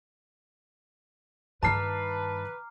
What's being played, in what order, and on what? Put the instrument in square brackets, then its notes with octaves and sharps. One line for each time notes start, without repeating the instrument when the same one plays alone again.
[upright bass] G2 D#3 [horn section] B4 [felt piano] A5 C7 [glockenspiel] A#5 D6 F6